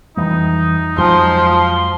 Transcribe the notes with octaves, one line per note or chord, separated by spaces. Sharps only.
F2 E3 G3 D#4
F2 F3 F#3 G#3 C6